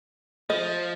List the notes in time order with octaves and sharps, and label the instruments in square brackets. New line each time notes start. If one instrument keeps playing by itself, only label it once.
[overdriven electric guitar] F3 [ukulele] D#5